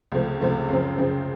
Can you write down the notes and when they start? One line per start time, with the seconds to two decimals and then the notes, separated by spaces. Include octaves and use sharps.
0.12 C#2 C3 F3 A3
0.40 C#2 C3 F3 A3
0.69 F#2 C#3 F3 C4
0.98 F#2 C#3 F3 C4